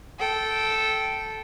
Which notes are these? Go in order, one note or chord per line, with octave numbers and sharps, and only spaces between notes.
A4 G5